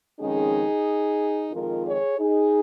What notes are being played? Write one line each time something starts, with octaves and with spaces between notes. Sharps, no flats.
F2 D#3 G#3 C#4 D#4 G#4
F2 D#3 G#3 F4 A#4
G#4 C#5
D#4 G#4